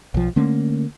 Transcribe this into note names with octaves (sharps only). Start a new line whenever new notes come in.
B1 F3
D3 A3 A#3 C#4